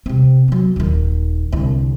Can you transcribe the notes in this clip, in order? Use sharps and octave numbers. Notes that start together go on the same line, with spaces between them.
C3 C4
F#3 B3
D#1 D#3
C2 D3